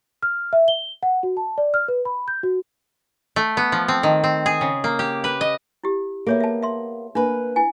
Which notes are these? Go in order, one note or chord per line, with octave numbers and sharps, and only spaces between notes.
F6
E5
G7
F#5
F#4
A5
D5
F6
B4
B5
G6
F#4
A3
B3
F3
C4
D#3
C4
G#4
C#3
A#3
G4
B4
D#5
E4 G4
A#3 B3 G#4 C#5 E5
E5 A5
E5 C6
A#3 D4 B4
E4 G#5